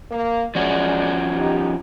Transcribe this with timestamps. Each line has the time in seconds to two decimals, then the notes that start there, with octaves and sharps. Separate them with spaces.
0.11 A#3
0.55 F3 G#3 C#4 F#4 D5
1.38 D#4 G4